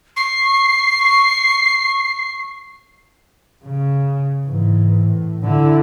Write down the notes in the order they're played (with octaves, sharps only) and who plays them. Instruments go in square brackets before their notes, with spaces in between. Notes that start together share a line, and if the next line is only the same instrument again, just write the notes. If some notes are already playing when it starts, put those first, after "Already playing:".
[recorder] C#6 [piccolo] C7
[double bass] C#3
G#2 E3
A2
D3 E4